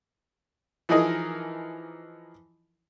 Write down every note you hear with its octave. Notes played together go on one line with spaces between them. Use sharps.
E3 F3 D#4 G#4 A#4 D#5